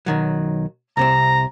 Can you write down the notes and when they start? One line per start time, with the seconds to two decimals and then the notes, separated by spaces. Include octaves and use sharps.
0.06 B1 D#3 F#3
0.97 C2 C3 C4 A#5